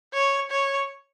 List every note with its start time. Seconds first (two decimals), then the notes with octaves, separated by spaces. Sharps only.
0.13 C#5
0.50 C#5